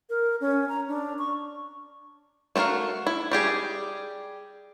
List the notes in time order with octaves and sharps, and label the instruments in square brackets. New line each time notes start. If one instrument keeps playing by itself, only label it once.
[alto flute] A#4
C#4
A#5
D4
C#6
[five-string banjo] A3 C4 F#4 A#4 F5
E4
G3 G4 G#4